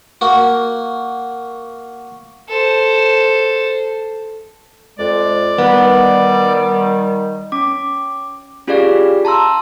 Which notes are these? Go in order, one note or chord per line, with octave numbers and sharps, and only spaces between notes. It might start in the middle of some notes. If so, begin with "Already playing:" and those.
A#3 F#4
A4 C5
F2 G#3 D5
D#3 G3 B3
C#4 D6
C#4 F4 G4 G#4 D5 F5
A5 A#5 C6 E6